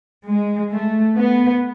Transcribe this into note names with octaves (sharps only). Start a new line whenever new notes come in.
G#3
A3
B3